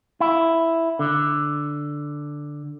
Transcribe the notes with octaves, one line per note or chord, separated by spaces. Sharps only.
E4
D3